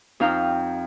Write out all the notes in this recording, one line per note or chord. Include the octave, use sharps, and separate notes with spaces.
F2 D#4 F5 G5 F6